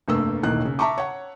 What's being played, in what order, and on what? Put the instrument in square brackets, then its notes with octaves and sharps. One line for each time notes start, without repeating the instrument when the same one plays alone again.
[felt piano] F1 G2 A3 A#3 E6
E1 B1 A2 D#3 A#3 F#6
C#3
E5 A5 A#5 C#6 D6
C#5 F#5